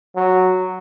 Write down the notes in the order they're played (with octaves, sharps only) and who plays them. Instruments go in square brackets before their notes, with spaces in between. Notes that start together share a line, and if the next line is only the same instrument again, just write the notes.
[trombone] F#3